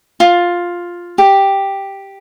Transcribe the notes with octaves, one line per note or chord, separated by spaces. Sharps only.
F4
G4